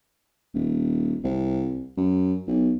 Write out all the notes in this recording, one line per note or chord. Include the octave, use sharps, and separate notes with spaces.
D#1
C2
F#2
B1